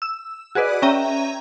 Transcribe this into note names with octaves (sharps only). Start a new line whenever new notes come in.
E6
F#4 G#4 B4 D5 D#5
C#4 E5 G5 A#5 D#7